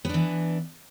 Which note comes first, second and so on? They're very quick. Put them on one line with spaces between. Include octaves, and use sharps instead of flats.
B3 D4 E3